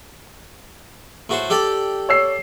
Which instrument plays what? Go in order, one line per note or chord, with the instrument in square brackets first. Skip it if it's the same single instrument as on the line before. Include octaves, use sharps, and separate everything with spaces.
[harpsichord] A2 F#4 C5
G4 A4 D5
[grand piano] C#5 E6 C7